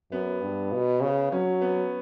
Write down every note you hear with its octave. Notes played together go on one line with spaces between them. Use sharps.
F#2 B3
G2
B2
C#3
F#3 C#4
B3